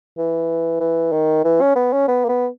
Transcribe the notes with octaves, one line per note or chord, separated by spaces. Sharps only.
E3
E3
D#3
E3
C#4
B3
C#4
B3
A#3
B3